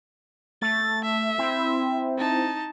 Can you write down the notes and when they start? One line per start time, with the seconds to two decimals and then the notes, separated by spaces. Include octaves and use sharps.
0.62 A3 A6
1.05 E5
1.38 C4 E4
2.18 D#4 A5